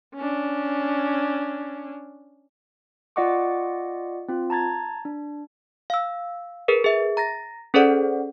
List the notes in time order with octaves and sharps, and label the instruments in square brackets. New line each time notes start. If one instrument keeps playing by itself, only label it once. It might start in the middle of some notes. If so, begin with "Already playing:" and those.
[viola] C#4 D4
[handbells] F4 D5 D#5 F#5 C#6 D6
C4 F4
A5 A#5 G#6 A6
D4
F5 E6
G#4 A#4 B4
G#4 E5
A#5 A6 A#6
C#4 G#4 A4 C5 D5 F#5